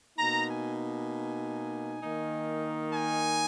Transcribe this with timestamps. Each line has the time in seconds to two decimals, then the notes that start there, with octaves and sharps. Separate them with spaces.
0.16 B2 A#3 D#4 A#5
0.48 G#5
0.78 G#5
2.02 D#3 A#3 D#4
2.93 G#5